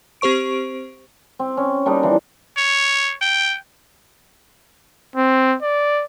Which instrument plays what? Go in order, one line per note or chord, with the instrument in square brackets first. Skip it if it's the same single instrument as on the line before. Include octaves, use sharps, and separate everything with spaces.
[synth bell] C4 G4 C5 C#6 D7
[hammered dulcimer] C4
C#4
G3 A#3 D4 D#4
E3 F3
[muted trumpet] C#5
G5
[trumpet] C4
D5